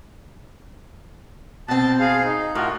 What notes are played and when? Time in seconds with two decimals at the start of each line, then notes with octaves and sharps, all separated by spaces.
1.68 B2 C4 A5
2.00 G#4 F5
2.24 D#4
2.55 A2 F4 F#4 A#4